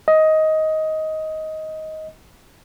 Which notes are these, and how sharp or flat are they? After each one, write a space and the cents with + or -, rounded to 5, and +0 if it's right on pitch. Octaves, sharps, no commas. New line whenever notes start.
D#5 +15